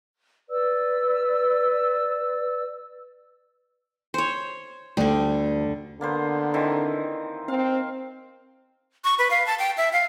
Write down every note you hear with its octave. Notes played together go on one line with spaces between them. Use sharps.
B4 D5 E6
C5 C#5
D2 D3 G3
D3 A#3 B3 C5
D#3 E3 C4
C4 F5
C#6
B4
F5
A5
G5
E5
F5